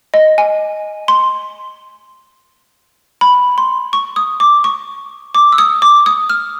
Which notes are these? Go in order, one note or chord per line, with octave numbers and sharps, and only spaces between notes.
D#5
G#5
C6
B5
C6
C#6
D#6
D6
C#6
D6
E6
D#6
D6
D#6
F6